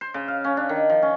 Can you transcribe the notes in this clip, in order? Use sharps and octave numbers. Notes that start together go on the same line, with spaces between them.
C5
C#3
F5
C#4
D4
D#3
F3
C#4